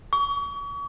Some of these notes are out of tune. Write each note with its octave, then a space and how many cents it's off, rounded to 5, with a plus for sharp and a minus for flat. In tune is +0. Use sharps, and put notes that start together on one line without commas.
C#6 +40